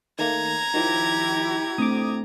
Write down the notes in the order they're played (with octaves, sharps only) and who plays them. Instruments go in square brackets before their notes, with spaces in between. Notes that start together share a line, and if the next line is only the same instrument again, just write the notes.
[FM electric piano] D#3 A3 A#3 [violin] A#5 G#6
[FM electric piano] D#3 F3 [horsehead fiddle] E4 G4
[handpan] A3 C4 D4 [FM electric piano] D6 D#6